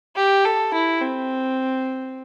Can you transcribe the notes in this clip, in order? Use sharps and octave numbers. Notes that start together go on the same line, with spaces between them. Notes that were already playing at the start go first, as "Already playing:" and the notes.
G4
A4
E4
C4